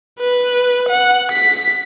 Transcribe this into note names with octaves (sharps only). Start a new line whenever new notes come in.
B4
F#5
B6